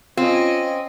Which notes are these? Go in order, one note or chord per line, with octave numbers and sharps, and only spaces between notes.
C4 C#4 F4 D#5